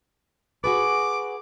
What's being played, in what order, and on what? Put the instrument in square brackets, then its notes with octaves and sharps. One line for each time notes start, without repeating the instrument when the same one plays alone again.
[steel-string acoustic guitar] F#4 G#4 B4 [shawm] D6